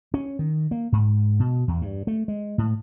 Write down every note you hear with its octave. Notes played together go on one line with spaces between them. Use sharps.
C#4
D#3
A#3
G#2
B2
E2
G2
A3
G#3
A2